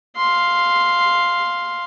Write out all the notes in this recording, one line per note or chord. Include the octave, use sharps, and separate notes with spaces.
F5 C6